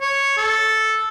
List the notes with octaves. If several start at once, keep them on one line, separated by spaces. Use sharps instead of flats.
C#5
A4